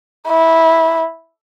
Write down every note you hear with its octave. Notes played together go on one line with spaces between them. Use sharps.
E4